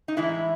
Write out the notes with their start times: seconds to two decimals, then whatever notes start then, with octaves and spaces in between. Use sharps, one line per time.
0.08 D#4
0.17 A2 E3 G#3 E4